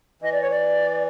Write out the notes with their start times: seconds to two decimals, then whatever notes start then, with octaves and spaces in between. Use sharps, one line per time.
0.22 E3 D#5
0.31 D5
0.41 C#5
0.50 D5